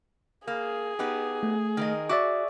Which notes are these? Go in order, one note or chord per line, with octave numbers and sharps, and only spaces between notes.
A#3 G#4
B3 D#4 G4
A3
D#3 A#4 D#5
F#4 D5 E5 D6